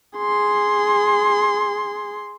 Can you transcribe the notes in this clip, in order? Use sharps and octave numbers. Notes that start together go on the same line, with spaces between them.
G#4 C6